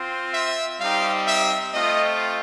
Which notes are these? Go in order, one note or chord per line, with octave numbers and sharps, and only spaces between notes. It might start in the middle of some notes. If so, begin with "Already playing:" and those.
Already playing: C4 F4
E5
G3 C4 D#4 G4 F5
E5
A3 C4 F4 D#5